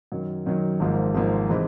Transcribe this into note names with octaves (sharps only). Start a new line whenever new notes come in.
F#2 D#3 F#3
F#2 D#3 F#3
G#1 G#2 F3 A#3
G#1 G#2 F3 A#3
C3 E3 G#3 C4